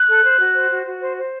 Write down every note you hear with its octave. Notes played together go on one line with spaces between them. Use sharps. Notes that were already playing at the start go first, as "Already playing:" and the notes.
Already playing: F#6
A4
C5
F#4
C5
F#4
F#4
C5
C5